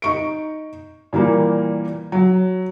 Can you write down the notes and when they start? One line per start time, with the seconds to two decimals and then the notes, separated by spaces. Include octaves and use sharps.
0.02 D#4 C#6 D7
1.13 A#2 E3 G3 A#3
2.12 F#3